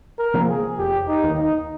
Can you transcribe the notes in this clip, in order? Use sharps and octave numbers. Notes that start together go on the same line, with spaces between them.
A#4
C3 F3 A#3
G#4
F1 G4
D#4
D#2 D#3
D#4